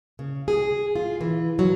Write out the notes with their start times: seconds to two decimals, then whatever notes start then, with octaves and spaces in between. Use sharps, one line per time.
0.19 C#3
0.48 G#4
0.96 F4
1.21 E3
1.59 F#3